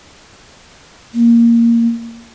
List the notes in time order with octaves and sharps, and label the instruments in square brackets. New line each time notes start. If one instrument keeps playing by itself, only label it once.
[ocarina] A#3